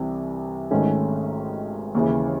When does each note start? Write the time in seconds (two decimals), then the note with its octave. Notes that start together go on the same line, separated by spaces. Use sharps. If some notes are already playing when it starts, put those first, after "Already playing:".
Already playing: C2 C3 E3
0.71 G#1 G#2 D#3 A3 C#4
1.95 D#2 C#3 E3